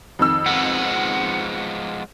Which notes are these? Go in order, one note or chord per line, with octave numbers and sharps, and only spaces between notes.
F2 D#3 E6
F3 G#3 B3 F#5